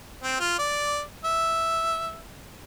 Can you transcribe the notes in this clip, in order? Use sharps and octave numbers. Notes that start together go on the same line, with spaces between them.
C4
F4
D5
E5